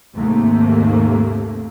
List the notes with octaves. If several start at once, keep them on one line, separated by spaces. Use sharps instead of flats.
D#2 G#2 C3 A3 A#3